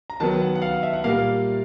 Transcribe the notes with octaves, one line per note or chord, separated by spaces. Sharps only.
A#5
D#3 F#3 B3 A5
F#5
F#5
F5
E5
F#5
A#2 G3 A#3 F5